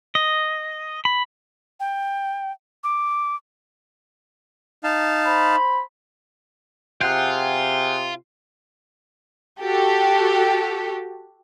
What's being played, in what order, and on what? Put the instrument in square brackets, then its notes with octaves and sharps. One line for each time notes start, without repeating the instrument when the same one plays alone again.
[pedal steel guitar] D#5
B5
[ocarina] G5
D6
[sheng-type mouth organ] D#4 F5 A5
[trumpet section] C5 B5
[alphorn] C3 [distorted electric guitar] F4 [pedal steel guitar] G#4 F#5 G5
[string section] F#4 G4 A4